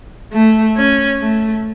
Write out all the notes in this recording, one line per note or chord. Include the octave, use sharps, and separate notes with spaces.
A3
C#4
A3